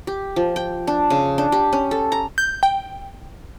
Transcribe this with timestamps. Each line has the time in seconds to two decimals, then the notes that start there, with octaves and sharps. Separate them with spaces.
0.07 G4
0.36 F3
0.56 G5
0.87 D4
1.10 C#3
1.38 D4
1.52 G4
1.73 C#4
1.91 A4
2.12 A#5
2.38 G6
2.63 G5